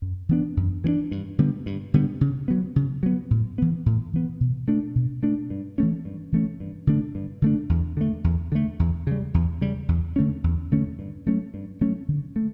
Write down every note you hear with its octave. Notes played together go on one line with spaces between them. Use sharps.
F#2
E3 B3 D4
F#2
E3 B3 D4
G2
D3 G3 B3
G2
D3 G3 B3
C#3
F#3 B3
C#3
F#3 B3
A2
E3 B3
A2
E3 B3
B2
A3 D4
B2
A3 D4
G2
E3 A3 C#4
G2
E3 A3 C#4
G2
D3 A3 D4
G2
D3 A3 D4
E2
D3 A3
E2
D3 A3
E2
C#3 G3
E2
C#3 G3
E2
D3 A3 C#4
E2
D3 A3 C#4
G2
F#3 A3 C#4
G2
F#3 A3 C#4
D3
A3